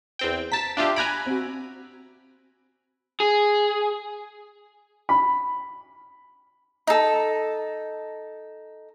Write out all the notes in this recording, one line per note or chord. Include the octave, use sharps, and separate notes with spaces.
E2 C4 G5
A5 A#5 A6 B6
D4 F4 G4 E5 D6 E6
G#5 A#5 B5 F#6 G#6 D7
C4 F#4
G#4
B5
D#4 A4